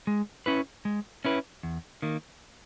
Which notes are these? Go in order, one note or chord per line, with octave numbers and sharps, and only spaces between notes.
G#3
C#4 E4 B4
G#3
C#4 E4 B4
E2
D#3 A#3